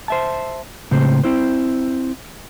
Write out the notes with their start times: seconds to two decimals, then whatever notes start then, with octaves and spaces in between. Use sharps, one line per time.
0.08 C5 E5 A5
0.91 A2 C#3 G#3 C4 C5
1.24 C4 E4 C5